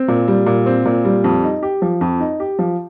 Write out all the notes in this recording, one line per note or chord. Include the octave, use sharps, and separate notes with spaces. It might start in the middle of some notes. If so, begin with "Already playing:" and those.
Already playing: C4
A#2
G3
A#2
C4
A#2
G3
F2
D#4
G4
F3
F2
D#4
G4
F3